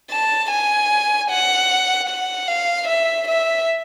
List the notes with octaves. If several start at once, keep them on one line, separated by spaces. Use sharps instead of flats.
A5
G#5
F#5
F#5
F5
E5
E5